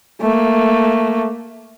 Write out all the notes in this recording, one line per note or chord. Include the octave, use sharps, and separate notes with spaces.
A3 A#3